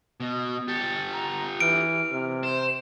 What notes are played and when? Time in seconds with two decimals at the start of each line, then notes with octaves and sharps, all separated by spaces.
0.20 B2
0.68 G4 A4 A6
1.13 A#5
1.60 E3 F6 D7
2.12 C3
2.43 C5 E7